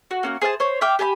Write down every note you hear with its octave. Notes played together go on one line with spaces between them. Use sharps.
F#4
A#3 C#4 F#4
G#4 C5 F5 A5
C5 C#5
E5 F5 G5 D6
G4 G#5 A5 B5